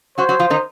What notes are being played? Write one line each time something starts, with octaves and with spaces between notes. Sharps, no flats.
F#3 F#4 C5
F#3 F#4
F3 F4
D#3 D#4